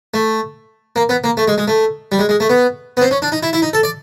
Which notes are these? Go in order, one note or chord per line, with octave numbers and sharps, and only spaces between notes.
A3
A#3
B3
A#3
A3
G#3
G#3
A3
G3
G#3
G#3
A3
B3
B3
C4
C#4
D4
D#4
E4
E4
D#4
A4
D5